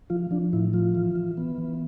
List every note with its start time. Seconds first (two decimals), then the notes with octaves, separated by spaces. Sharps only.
0.10 F3 F4
0.31 F3 D4
0.53 A2 E4
0.73 F3 F4
0.95 E3
1.15 E3
1.37 B3
1.58 E3